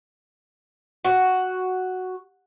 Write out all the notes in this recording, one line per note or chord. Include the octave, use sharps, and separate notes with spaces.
F#4